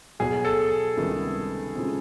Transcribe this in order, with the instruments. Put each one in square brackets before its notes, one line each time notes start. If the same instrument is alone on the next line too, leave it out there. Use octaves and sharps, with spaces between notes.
[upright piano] B1 B2 F#3 [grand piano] G#4
[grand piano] A4
[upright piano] C#2 C3 D#3 G3 B3
C#3 F3 G#3 C4